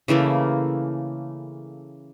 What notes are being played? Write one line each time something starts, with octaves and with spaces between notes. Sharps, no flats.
C#3 E3 A3 A#3